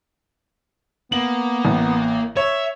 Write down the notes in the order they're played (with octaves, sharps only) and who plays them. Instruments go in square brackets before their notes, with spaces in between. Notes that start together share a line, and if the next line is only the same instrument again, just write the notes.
[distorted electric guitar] A#3 [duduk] B3 [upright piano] F#7
[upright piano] A1
[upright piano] C#5 [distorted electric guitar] E5